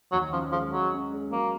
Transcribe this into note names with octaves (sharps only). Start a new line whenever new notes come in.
D#2 F#3
F3 C#4
F3 G#3
F#3 G#3
C#4
G#3
F#3 A#3